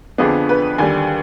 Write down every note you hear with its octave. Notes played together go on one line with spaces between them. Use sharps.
F2 D3 F3 B3 D4 G#4
B4
D#2 D3 G3 G#5